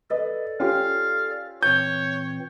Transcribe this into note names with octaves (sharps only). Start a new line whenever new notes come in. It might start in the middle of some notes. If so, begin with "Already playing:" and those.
A4 B4 D5 D#5
C#4 F4 G4 F5
A#2 E3 C4 C#5 G6